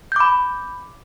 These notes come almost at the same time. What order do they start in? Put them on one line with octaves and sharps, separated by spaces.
G6 D6 B5